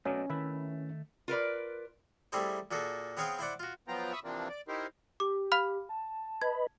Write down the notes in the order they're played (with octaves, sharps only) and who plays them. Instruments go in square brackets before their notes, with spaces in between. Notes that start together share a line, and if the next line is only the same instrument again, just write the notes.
[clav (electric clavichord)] B2 F#3 D#5 [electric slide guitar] A3 D5 [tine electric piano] C#4
[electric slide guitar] D#3 A3 [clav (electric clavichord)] E4 B4 E5
[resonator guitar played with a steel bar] F4 A#4 B4 D5
[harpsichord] G3 A3 C4 E4 G#4 C5
A#2 F#4 G#4 A4
B3 C4 G#4 C#5 F5 G5
E4 C5 D5 F#5
F4 F#4
[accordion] F3 F#3 B3 F4 G5 A#5
E5 B5 C#6 D#6 E6
C3 E3 F3 A#3 C4 D4
D5
D#4 E4 G4 A#4 C5
[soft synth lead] G4 [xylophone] D6
[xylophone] F5 B5 F6
[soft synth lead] A5
[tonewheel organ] B4 D#5 B5 [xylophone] G#6